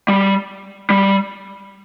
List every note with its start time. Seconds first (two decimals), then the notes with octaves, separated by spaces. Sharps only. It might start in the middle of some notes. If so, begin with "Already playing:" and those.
0.08 G3
0.90 G3